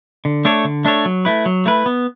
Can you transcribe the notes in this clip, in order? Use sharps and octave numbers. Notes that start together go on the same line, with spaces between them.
D3
A3 D4 A4 C#5
D3
A3 D4 A4 C#5
F#3
A3 E4 B4
F#3
A3 E4 B4
B3